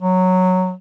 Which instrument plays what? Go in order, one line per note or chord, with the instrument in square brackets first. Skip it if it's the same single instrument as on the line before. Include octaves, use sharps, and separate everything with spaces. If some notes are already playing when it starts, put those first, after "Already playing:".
[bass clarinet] F#3